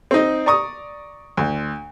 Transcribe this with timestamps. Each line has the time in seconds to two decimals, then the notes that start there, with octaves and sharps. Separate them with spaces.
0.11 C4 D#4
0.46 D5 A#5 C#6 D#6
1.37 D2